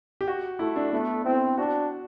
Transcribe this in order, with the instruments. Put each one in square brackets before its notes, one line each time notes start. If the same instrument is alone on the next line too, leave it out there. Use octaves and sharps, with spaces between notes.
[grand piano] G4
F#4
[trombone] A3 [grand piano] E4
[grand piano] D4
[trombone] A3 [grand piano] B3
[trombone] C4 [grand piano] E4
[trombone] D4 [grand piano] F#4